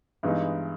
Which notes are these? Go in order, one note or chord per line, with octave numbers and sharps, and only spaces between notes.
G2 E3 G#3 B3 D#4